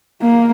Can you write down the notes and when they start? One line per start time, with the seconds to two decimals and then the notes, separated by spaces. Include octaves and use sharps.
0.21 A#3